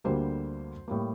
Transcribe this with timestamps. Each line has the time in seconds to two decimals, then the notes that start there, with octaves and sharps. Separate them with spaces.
0.04 D2 D3 G3 A#3 C5
0.88 A2 G3 A#3